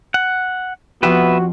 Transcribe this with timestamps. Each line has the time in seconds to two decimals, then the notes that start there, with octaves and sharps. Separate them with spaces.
0.14 F#5
1.03 F2 F3 B3 F#4 G4 B4 E5